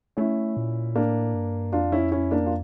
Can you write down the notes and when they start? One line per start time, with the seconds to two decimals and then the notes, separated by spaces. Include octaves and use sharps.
0.17 A3 C#4 E4
0.57 A#2
0.95 A2 A#3 D4
1.34 G2
1.72 F2 D4 F4
1.92 C#4 E4
2.12 C#4 E4
2.31 A#3 D4
2.46 F4